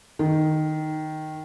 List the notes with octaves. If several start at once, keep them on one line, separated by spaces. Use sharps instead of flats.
D#3